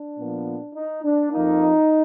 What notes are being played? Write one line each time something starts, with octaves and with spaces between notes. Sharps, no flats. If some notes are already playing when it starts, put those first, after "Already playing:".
Already playing: D4
A#2 F3 B3
D#4
D4
F2 F3 A#3 D#4